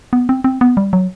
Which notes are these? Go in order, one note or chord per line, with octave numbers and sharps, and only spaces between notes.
B3
C4
C4
B3
G3
F#3